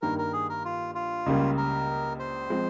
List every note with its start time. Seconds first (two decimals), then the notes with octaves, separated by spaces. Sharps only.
0.02 G2 D#3 G3 A#3 A#4
0.18 A#4
0.33 G#4
0.49 A#4
0.65 F4
0.95 F4
1.26 C#2 C#3 G3 A#3
1.57 A#4
2.19 C5
2.50 F3 G#3 C4